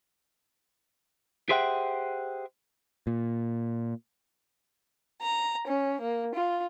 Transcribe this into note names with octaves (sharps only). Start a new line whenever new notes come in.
G4 G#4 C5 E5 F#5 G5
A#2
A#5
C#4
A#3
F4